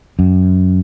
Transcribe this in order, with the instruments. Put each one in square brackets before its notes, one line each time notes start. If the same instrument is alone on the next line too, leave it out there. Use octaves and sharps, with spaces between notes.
[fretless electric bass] F#2